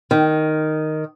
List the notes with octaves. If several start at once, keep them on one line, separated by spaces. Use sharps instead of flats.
D#3